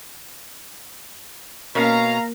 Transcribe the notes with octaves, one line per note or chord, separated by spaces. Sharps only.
B2 A#3 C#4 A#4 F5 A#5